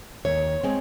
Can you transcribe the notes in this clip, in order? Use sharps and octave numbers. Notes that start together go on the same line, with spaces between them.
D#2 C#5
G#3 C4